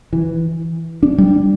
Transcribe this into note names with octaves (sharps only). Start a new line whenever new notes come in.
E3
D4
G3